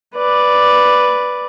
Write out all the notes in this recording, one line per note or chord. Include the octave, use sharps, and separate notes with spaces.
B4 D5